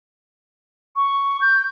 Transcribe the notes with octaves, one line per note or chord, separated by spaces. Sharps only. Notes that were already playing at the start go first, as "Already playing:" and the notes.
C#6
G6